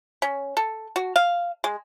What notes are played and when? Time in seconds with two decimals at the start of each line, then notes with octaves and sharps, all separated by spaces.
0.22 C#4
0.57 A4
0.96 F#4
1.16 F5
1.64 G#3